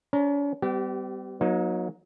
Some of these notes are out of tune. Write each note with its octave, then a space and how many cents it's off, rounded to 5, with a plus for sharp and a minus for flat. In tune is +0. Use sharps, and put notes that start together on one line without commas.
C#4 +45 C#5 -40 A#5 +0
G3 +0 B3 +40 G4 -25
F#3 -25 A#3 +40 D#4 +0